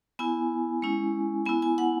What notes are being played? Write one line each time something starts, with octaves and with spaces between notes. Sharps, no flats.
B3 E4 G#5
G#3 C#4 E4
B3 E4 G#5
G#5
F#5